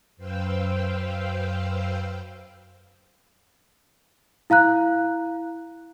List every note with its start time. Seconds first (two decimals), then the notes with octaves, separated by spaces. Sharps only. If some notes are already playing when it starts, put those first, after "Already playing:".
0.16 F#2 B4 C5 F5 G5 E6
4.50 E4 F5 A#5 F#6